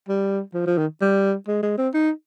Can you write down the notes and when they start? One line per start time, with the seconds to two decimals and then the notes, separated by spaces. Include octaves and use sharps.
0.08 G3
0.54 F3
0.66 F3
0.78 D#3
1.01 G3
1.47 G#3
1.63 G#3
1.78 C4
1.94 D#4